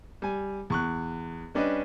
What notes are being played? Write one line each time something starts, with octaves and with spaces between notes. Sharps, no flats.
G3 G#5
E2 C#6 F#6
G3 C#4 D4 G4 B4 D#5